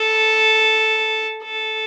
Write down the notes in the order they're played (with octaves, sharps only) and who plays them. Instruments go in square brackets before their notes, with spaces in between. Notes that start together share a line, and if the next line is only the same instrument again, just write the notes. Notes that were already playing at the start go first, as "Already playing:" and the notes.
Already playing: [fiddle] A4
A4